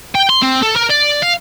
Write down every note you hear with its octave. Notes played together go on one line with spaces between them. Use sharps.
G5
C6
C4
A4
A#4
D5
F5